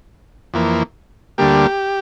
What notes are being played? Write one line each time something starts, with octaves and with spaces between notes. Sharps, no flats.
F2 E3 A#3
D2 D3 G3 A#3 G4